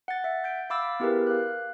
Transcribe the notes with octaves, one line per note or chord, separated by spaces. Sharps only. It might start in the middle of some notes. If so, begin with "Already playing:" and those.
F#5 A6
E5 F#5
G6 B6 D7
F5 B5 D6 E6 A6
B3 E4 G4 G#4 A#4 B4
F5 F#6